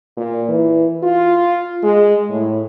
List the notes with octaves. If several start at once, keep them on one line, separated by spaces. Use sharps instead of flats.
A#2
E3
F4
G#3
A2